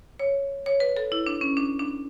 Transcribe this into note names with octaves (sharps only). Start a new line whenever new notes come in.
C#5
C#5
B4
A4
E4
D4
C#4
D4
D4